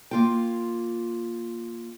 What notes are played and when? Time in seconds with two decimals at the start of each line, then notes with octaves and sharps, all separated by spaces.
0.11 A#3 F4 G5